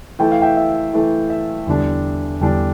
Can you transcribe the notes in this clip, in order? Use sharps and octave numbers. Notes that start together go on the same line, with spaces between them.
E3 A3 E4 G5
F5
E5 G5
E5
E3 A3 E4 E5
E5
E2 D3 G3 D4
E2 D3 G3 D4